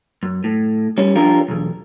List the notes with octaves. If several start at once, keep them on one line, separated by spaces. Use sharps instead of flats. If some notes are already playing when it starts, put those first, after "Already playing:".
F#2
A2
G3 C#4
F3 D4 F4 G4 A#4
B1 E2